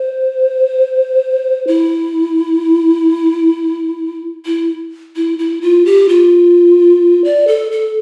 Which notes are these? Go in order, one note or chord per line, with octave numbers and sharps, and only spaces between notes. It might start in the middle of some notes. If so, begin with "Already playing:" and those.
Already playing: C5
E4
E4
E4
E4
F4
G4
F4
D5
A4
A4